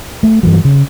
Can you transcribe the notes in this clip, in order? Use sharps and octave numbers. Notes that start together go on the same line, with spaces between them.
A3
G2 E3 F#3
C#3